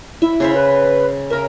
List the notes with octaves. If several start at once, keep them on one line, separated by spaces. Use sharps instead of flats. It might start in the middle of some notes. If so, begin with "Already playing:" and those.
E4 E5
C#3 C5 E5
B4
C#3 A#4 E5